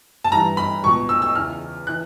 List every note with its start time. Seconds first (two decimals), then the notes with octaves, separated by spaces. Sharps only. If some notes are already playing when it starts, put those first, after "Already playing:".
0.24 A5
0.31 G2 E3 A#5
0.57 B5
0.83 C#2 B2 C#6
1.09 E6
1.22 E6
1.35 E2 C#3 E3 F6
1.87 E3 F#6